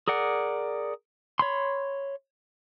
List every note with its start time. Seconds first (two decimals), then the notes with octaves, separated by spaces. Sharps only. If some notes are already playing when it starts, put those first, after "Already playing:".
0.08 G#4 A#4 D5 F#5
1.39 C#5 B5 C6